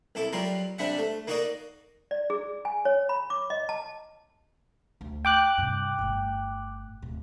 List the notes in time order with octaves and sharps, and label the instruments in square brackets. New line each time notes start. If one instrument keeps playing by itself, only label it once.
[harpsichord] C2 E4 A4 D6
F#3 G3 F4 A#4
C3 G3 D4 E5 F#5
A3
A#3 D#4 F#4 A#4 D5 D#5
[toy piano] D5
G#4
G#5
C#5
B5
D6
D#5
A5
[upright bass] D2
[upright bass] F4 [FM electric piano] G5 D6 F#6
[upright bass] G2 C3
G1 A2
D1 A2